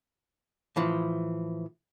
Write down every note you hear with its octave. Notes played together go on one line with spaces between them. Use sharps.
A2 E3 F3